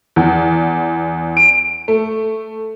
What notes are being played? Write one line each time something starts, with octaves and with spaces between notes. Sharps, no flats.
E2
D7
A3